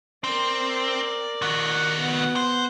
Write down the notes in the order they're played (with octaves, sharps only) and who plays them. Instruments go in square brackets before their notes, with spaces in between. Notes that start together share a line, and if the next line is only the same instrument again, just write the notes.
[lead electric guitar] C4 [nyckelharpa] A#4 D5
[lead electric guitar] D#3 F#4
[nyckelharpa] B3 F#5
[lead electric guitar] C5